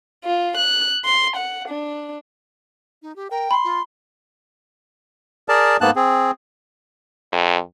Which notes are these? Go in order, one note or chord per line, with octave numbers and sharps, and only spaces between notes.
F4
F#6
C6
F#5
D4
D#4
G4
A#4 G5
B5 C6
F4
G#4 A#4 D5 A5
G#2 A#3 B3 A5 F#6
C4 G#4
F2